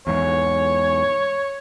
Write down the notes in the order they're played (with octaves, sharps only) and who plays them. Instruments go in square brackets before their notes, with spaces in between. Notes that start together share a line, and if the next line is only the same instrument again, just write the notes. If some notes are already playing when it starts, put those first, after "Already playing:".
[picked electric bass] E2 G#2 [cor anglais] C#5